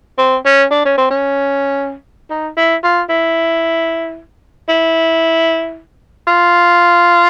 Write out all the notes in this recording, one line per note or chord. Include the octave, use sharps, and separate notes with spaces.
C4
C#4
D4
C#4
C4
C#4
D#4
E4
F4
E4
E4
F4